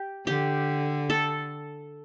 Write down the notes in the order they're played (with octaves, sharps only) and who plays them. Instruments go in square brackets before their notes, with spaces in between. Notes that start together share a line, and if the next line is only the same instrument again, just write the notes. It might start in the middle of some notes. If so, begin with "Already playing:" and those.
Already playing: [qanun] G4
[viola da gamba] D3 [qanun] G4
[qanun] A4